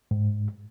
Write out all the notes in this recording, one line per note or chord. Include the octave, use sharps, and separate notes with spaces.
G#2